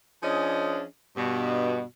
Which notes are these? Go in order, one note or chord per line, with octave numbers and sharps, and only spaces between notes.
F3 C#4 D4 G#4 D#5
G2 B2